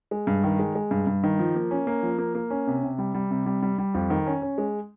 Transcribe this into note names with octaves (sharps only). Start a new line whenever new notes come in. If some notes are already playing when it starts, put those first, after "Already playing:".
G#3
G2
D#3
G#3
G#3
G2
G2
D#3
F3
A#3
C#4
A#3
F3
A#3
A#3
C#4
C3
C3
G3
G3
C3
G3
G3
G3
F2
D#3
C#4
C#4
G#3